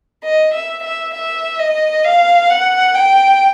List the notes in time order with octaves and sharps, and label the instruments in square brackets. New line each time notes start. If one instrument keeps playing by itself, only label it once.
[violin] D#5
E5
E5
E5
D#5
F5
F#5
G5